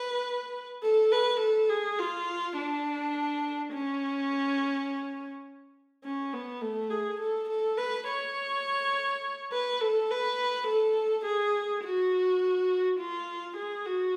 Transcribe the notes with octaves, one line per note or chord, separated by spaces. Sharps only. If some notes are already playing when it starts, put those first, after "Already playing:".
Already playing: B4
A4
B4
A4
G#4
F4
D4
C#4
C#4
B3
A3
G#4
A4
A4
B4
C#5
B4
A4
B4
A4
G#4
F#4
F4
G#4
F#4